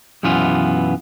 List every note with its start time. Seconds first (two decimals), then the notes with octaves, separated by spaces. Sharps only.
0.23 B1 F#2 E3 B3 F4